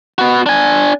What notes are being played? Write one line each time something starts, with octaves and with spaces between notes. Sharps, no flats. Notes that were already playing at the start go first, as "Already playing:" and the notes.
B3 F#4
D4 G#5